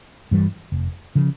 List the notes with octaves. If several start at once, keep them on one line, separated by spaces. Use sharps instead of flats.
G2 E3 G3
F1
C#3 F3